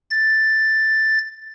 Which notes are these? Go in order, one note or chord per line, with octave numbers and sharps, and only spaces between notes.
A6